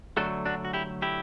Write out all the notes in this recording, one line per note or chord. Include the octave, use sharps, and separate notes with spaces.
D3 F#3 A3 F#4 A4
D4 F#4
F#4
E4 G4
E4 G4